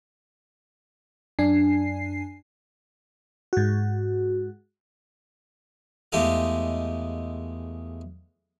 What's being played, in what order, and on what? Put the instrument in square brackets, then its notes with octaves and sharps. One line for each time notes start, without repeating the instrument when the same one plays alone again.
[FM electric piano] F#2 D4 G#5 C7
G#2 F#4
[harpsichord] E2 G#3 A3 G4 D#5 F5